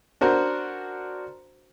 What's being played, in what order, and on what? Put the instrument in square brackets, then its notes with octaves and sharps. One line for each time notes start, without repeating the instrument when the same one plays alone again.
[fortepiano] D4 F#4 A#4 C5